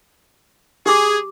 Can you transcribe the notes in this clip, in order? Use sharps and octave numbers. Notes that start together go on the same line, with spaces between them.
G4 G#4 D6